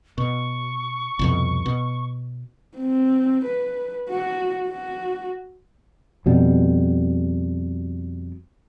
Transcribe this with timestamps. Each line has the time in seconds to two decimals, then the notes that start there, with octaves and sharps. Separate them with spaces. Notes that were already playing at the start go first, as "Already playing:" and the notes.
0.18 B2 C#6
1.19 C2 F2 B2
1.66 B2
2.77 C4
3.45 B4
4.09 F#4
4.68 F#4
6.26 F2 B2 G3